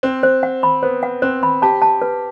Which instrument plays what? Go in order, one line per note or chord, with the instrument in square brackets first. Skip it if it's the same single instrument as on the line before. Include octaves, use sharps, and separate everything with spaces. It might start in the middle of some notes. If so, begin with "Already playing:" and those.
[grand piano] C4 [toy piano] C5
[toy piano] C5
F#5
B5
[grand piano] B3 [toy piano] C5
[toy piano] F#5
[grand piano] C4 [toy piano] C5
[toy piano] B5
[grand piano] G4 [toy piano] A5
[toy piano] A5
B4